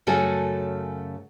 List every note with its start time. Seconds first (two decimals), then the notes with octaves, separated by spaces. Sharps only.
0.07 F#2 C#3 A3 F#4 A4 G#5